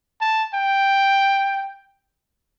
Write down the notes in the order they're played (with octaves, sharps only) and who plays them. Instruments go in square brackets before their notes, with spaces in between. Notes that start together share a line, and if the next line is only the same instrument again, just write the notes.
[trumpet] A5
G5